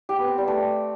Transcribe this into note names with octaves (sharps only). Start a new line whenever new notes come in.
G4
B3
C4
G3
A3